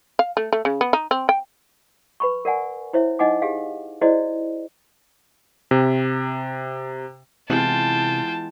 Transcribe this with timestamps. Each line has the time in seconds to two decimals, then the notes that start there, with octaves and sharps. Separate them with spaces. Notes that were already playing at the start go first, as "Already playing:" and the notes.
0.19 F5
0.37 A3
0.53 A3
0.65 C#3
0.81 B3
0.93 D#4
1.11 C4
1.29 G5
2.20 B4 B5 C#6
2.45 A#4 D5 F#5 G#5
2.93 E4 C5 C#5 E5
3.19 D#4 D#5 F#5 G#5 D6
3.42 G4 G#4 F5
4.01 E4 F#4 G#4 C5 D5 D#5
5.71 C3
7.50 C3 E3 G#3 B3 F4 G5 A5